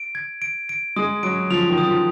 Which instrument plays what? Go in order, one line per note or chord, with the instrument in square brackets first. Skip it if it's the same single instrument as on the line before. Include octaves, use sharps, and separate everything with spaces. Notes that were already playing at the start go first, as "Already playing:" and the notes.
Already playing: [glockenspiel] D7
G#6
D7
D7
[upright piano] G#3 [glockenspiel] D#6
[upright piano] F#3 [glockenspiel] D7
[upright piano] F3 [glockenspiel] F7
[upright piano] D#3
[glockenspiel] D#6
[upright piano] F3